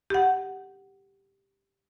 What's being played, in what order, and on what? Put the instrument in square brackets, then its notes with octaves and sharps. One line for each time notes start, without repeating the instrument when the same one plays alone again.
[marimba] G4 F#5